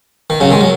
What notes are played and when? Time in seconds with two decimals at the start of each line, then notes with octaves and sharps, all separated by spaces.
0.30 D#3
0.40 C#3 F#3
0.51 D#3 G#3
0.61 F#3